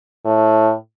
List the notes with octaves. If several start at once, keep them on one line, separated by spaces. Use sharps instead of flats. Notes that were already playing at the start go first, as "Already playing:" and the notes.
A2